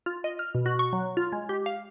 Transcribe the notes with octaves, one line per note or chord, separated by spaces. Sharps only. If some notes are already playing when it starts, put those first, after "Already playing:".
F4
D#5
F6
B2
F#4
C#6
F#3
F4
G#3
G4
F5